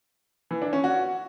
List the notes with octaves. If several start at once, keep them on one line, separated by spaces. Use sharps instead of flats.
E3
D4
C#4
F#4